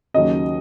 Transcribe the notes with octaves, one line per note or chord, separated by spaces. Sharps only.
D#2 C#3 F#3 C#4 D#5